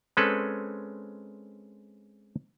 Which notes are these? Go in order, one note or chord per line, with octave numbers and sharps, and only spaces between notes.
G#3 C4 C#4 A4 B4